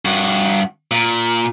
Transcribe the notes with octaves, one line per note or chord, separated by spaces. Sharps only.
G2 F#4
A#2